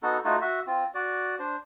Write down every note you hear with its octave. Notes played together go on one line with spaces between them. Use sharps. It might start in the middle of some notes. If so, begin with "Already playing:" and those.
B3 D#4 F#4 A4
A3 D#4 F4 F#4
F#4 E5
C4 F4
F#4 D5
D4 C5